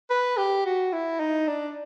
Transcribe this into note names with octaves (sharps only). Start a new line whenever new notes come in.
B4
G4
F#4
E4
D#4
D4